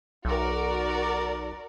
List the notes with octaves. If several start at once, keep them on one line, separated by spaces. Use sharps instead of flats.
B1 F#4 A#4 D5